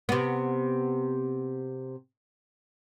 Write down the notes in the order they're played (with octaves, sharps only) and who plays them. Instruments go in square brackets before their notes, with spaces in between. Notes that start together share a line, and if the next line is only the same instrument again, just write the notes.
[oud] C3 B3